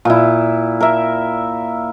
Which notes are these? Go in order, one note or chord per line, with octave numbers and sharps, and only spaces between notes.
A#2 E4
A#4 E5